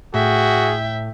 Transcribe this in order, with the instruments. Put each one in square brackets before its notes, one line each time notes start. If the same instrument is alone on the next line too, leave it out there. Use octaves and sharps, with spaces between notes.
[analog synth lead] A2 [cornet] F#4 [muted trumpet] G#4 [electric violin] E5 G5